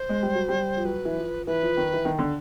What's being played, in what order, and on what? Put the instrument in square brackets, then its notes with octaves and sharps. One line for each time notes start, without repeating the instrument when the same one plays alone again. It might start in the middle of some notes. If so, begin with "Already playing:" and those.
Already playing: [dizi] C5
[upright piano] G#3
G3
F#3
G3
F3
[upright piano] F#3 [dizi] B4
[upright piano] E3
F3
[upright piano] E3 [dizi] B4
[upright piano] F3
D#3
E3
D#3
D3